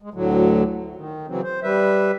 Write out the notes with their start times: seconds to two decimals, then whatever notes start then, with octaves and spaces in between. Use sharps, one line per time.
0.02 G#3
0.14 D2 A2 D3 F#3
0.95 D#3
1.28 C#3 E3 F#3 C4
1.43 C5
1.63 G3 B4 E5